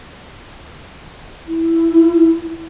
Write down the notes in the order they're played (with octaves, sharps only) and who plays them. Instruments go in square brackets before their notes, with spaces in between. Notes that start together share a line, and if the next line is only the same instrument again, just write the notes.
[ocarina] E4